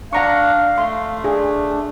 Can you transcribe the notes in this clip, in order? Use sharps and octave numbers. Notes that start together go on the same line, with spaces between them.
D4 F5 F#5 A#5 C#6
A3 C6
D4 G#4